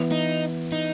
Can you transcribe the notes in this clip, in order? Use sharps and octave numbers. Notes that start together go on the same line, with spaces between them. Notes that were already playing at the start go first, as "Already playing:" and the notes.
Already playing: E3 B3 E4
D#4
D#4